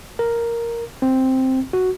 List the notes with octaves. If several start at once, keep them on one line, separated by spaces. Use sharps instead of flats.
A#4
C4
F#4